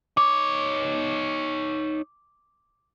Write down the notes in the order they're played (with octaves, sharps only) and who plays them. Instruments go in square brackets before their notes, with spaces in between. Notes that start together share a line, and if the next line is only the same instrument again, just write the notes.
[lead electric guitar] D#4 C#5 [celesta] D6